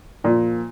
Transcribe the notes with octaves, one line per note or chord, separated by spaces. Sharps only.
A#2 F3 A#3